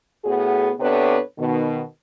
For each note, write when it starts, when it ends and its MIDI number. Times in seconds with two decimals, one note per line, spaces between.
0.24 0.72 45
0.24 0.72 59
0.24 0.72 66
0.24 0.72 68
0.80 1.19 48
0.80 1.19 59
0.80 1.19 62
0.80 1.19 69
0.80 1.19 71
0.80 1.19 73
1.38 1.82 47
1.38 1.82 51